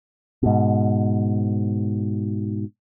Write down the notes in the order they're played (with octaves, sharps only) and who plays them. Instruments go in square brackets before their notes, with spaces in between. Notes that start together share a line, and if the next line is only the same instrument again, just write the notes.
[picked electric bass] G#2 B2